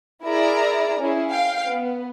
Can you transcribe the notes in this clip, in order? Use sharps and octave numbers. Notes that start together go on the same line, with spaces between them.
E4 G#4 A#4 D5 A#5
C#4 E4 G#4
F5 G5
B3